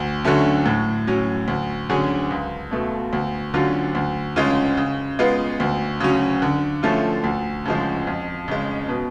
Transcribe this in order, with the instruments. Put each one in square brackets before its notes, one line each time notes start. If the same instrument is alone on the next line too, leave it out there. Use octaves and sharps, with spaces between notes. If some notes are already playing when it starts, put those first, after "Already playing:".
Already playing: [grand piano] D2
D3 F#3 A3 C#4
A2
F#3 C#4
D2
D3 F#3 C#4 G#4
C#2
B2 A3
D2
D3 F#3 C#4 F4
D2
C#3 G#3 C#4 F4
C#3
G#3 B3 F4
D2
C#3 F#3 C#4
D3
F3 A3 C#4 F4
D2
C#3 F3 G#3
F2
C#3 G#3
B2